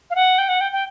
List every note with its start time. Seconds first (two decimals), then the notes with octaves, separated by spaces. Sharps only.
0.10 F5
0.15 F#5
0.38 G5
0.49 F#5
0.61 G5
0.72 G5